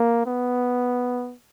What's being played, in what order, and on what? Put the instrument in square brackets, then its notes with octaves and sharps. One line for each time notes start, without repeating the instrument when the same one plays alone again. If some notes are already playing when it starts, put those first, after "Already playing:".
Already playing: [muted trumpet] A#3
B3